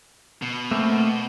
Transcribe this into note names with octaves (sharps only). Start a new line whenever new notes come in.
B2
A3 A#3 C4